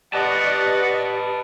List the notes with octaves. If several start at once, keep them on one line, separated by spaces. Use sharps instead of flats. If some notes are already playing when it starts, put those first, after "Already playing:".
G4 B4 D5 D#5 F#5 A5